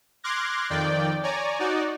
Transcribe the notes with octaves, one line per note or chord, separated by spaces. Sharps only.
C6 D6 F6 F#6 G#6 A#6
F2 D#3 D5 G5
C#5 D5 G#5 A#5
D#4 F#4 D5